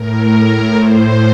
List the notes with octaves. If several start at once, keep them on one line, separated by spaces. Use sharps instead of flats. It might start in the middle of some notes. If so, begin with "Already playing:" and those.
Already playing: A2 A#4
A#4
A2 C5